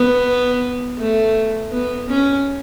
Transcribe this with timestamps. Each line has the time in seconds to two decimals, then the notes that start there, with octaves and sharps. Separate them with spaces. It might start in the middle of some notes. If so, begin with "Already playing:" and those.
Already playing: B3
0.98 A3
1.72 B3
2.09 C#4